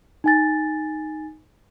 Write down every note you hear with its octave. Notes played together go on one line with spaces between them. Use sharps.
D#4 G#5 A6